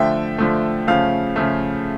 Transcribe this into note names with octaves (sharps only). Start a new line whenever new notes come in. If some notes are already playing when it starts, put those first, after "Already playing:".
Already playing: D3 F3 A3 E5 G5
D3 F3 A3
C#3 F3 A3 F5
C#3 F3 A3